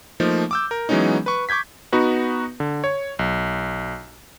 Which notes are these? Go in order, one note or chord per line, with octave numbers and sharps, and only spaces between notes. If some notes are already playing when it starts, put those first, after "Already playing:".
F3 A3 A#3 D#4
D6 E6 G6
A#4
E3 F#3 G#3 B3 C#4 D#4
B4 C#6
C#6 D6 G6 G#6 B6
B3 D#4 F#4 B4
D3
C#5
B1